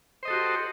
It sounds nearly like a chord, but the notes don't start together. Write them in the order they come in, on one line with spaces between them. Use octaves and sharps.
C5 D#5 A4 F#4 G4